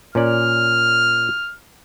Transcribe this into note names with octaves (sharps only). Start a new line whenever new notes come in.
A#2 C#4 D5 F6